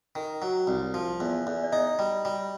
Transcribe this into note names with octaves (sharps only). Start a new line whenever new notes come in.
D#3
F#3
C2
F3
E2
E2
D5
D#4 D#5
G3
G3